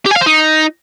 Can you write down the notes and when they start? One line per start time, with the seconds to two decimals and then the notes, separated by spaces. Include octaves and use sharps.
0.06 G4
0.11 G#5
0.16 F5
0.21 C5
0.26 D#4